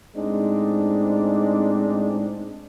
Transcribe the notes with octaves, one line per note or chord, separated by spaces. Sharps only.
A2 G#3 C4 D4 D#4